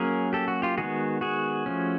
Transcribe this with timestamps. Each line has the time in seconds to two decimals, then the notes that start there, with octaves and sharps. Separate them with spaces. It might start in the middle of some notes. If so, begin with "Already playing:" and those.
Already playing: F#3 A#3 C#4 G#4 A#4
0.33 G4 A4
0.48 F#4
0.62 F4 G4
0.78 D#3 G#3 B3 F#4 G#4
1.21 F#4 G#4
1.66 F3 A3 C#4